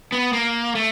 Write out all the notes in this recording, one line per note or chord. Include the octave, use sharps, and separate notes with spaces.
B3
A#3
A3